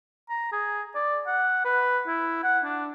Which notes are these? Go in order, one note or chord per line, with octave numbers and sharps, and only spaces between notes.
A#5
G#4
D5
F#5
B4
E4
F#5
D4